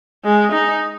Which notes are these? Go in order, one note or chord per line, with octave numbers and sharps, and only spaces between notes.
G#3
D#4